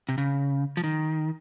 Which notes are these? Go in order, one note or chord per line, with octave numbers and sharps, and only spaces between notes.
C3
C#3
F3
D#3